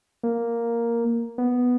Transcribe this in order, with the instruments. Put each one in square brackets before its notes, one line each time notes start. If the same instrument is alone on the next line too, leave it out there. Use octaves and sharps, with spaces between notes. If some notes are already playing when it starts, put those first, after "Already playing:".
[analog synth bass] A#3
B3